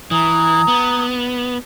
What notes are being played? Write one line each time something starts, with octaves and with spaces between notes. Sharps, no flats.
E3 A#5 D#6 G#6
B3